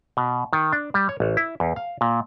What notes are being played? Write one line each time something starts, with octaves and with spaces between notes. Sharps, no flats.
B2
D#3
D4
G3
C#5
A1
E4
E2
F5
A#2